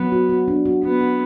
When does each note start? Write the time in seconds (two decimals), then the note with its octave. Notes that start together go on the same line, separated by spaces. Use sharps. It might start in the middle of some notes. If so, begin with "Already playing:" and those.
Already playing: F#3 B3
0.12 F#4
0.30 F#4
0.48 D4
0.66 F#4
0.83 B3 F#4
1.01 F#4